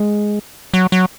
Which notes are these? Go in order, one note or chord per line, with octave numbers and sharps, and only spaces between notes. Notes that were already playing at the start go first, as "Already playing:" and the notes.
Already playing: G#3
F#3
F#3